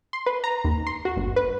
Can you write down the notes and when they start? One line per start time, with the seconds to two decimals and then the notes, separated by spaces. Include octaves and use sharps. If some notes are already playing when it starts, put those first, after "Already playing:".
0.13 C6
0.26 B4
0.44 A#5
0.64 D#2
0.87 C6
1.05 F#4
1.17 G1
1.36 B4